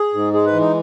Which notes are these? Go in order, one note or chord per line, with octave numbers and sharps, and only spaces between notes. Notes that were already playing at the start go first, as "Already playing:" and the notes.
Already playing: G#4
G#2
G#3 G#4
B4
E3
D#4